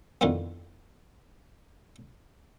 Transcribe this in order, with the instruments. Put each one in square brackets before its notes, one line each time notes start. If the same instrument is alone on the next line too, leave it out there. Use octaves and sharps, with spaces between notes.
[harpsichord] F2 A2 D3 D#3 F3 B3